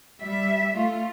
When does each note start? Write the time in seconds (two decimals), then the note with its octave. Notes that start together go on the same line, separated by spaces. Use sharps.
0.19 G3 E5
0.72 A3 F4